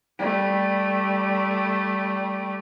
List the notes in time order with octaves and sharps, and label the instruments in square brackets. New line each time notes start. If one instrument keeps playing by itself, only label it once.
[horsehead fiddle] G3 A3